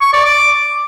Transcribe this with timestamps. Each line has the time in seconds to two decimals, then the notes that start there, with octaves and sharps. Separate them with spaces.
0.01 C#6
0.13 D5
0.25 D6